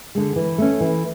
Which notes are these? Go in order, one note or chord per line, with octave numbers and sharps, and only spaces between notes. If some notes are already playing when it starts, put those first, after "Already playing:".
D3 G#3
E3
A3 C#4
E3